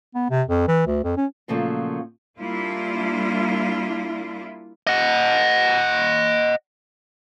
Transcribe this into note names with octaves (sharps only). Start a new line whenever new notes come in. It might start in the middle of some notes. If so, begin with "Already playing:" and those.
B3
C3
F2
E3
D2
F2
C#4
A#2 C#3 F3 F#3 A3 A#3
G3 A#3 D4 E4 F4
D#5 F#5